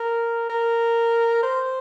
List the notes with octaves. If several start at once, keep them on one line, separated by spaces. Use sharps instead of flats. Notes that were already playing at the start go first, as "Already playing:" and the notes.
Already playing: A#4
A#4
C5